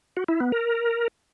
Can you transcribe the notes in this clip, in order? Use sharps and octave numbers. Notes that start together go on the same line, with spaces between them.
F#4
E4
B3
A#4